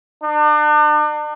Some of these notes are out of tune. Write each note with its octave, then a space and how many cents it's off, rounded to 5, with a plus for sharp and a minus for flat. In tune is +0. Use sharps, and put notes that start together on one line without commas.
D4 +40